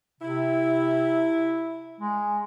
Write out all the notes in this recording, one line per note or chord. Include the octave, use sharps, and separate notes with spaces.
C3 E4
G#3